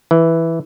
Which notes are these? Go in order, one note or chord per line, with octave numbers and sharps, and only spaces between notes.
E3